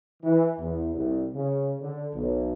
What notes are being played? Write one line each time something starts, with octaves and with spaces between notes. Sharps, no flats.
E3
E2
C2
C#3
D3
B1